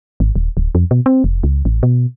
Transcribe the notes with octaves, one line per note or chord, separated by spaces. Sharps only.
G#1
D#1
D1
F2
B2
C4
F1
C#2
A1
B2